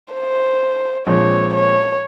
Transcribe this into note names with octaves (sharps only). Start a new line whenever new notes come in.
C5
A#1 A#2 F3 G#3 C4 C#5
C#5